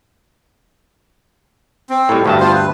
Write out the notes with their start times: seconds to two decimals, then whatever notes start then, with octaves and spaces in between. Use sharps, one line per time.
1.90 C4
2.09 A2 G3
2.26 D2 G2 F#4 A5
2.40 B3 F4 C5
2.54 B4